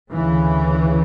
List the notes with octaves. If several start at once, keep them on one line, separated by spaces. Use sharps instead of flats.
D2 C#3 E3